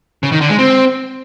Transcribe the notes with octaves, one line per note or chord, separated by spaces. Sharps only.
C#3
D#3
D3
G#3
C4